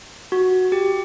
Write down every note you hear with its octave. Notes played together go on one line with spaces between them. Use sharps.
F#4
G4